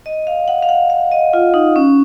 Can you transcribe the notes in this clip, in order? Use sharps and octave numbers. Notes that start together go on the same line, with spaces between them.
D#5
F5
F#5
F5
F#5
F5
D#5
F4
D#4
C#4